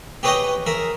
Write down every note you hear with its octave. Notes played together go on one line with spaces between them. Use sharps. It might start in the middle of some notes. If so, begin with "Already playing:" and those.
G4 G#4 B4 C#5 D#5 G5
G#4 A#4 E5